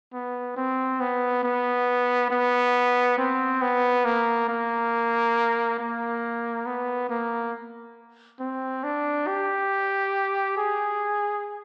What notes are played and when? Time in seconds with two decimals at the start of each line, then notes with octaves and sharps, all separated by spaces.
0.13 B3
0.56 C4
1.00 B3
1.43 B3
2.30 B3
3.18 C4
3.62 B3
4.05 A#3
4.48 A#3
5.79 A#3
6.66 B3
7.10 A#3
8.40 C4
8.84 D4
9.27 G4
10.57 G#4